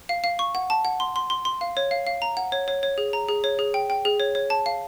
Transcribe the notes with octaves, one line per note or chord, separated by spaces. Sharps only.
F5
F5
C#6
F#5
A5
F#5
C6
C6
C6
C6
F5
C#5
F5
F5
A#5
F#5
C#5
C#5
C#5
G#4
A#5
G#4
C#5
G#4
G5
G5
G#4
C#5
C#5
A5
F5